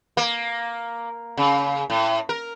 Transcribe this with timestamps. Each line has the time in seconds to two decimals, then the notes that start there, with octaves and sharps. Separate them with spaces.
0.17 A#3
1.37 C#3
1.90 A2
2.29 A#4